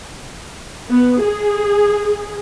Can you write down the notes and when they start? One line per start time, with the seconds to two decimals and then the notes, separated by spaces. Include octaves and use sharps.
0.89 B3
1.21 G#4